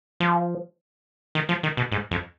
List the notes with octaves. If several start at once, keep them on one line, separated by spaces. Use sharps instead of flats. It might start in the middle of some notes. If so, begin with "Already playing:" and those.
F3
D#3
F3
D#3
B2
G#2
F2